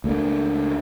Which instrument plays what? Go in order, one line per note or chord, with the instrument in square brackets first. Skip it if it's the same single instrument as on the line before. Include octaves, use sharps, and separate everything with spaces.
[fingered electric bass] C#2 A3 A#3 D4